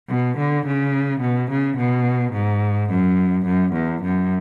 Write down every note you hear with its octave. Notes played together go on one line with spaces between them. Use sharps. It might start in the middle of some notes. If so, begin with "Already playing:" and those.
B2
D3
C#3
B2
C#3
B2
G#2
F#2
F#2
E2
F#2